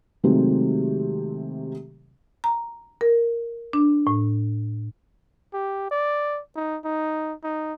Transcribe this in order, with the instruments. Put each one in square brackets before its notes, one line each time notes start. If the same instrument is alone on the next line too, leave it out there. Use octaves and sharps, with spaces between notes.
[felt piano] C3 D#3 F#3 G#3 A3 C4
[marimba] A#5
A#4
D4
A2
[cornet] G4
D5
D#4
D#4
D#4